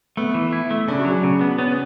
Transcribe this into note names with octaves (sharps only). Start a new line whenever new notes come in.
A3 B3
E3
E4
A3
C#3 D4
F#4
F#3
G#4
C#3 F#4
B3
B3 C#4